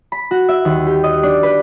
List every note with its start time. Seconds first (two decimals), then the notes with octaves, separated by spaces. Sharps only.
0.12 B5
0.31 F#4
0.49 E5
0.65 D#2
0.87 G4
1.04 D#5
1.23 D4
1.43 B4